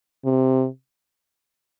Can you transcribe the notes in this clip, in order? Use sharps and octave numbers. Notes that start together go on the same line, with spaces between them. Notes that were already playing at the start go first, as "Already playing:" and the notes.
C3